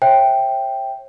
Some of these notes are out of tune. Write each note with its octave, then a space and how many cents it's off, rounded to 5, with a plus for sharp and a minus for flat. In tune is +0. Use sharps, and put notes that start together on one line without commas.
C#5 -45 E5 +0 G5 +0